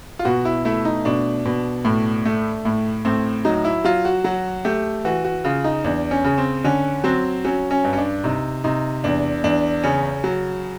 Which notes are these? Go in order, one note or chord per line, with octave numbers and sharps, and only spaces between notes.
F4
B2 F#4
E4
A3 E4
D#4
B2 D4
B2
A2
A3
A2
A2 C4
F#3 D#4
E4
F#3 F4
F#4
F#3 F#4
A3 G4
E3 F#4
F#4
C#3 F4
D#4
E2 D4
C#4
C#3
C4
D3 C#4
F#3 C4
F#3 C#4
C#4
G2
C#4
D4
C3 D#4
C3 D#4
E2 D4
E2 D4
C#3 C#4
F#3